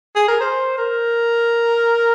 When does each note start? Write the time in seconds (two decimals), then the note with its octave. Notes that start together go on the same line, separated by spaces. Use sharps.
0.16 G#4
0.28 A#4
0.40 C5
0.78 A#4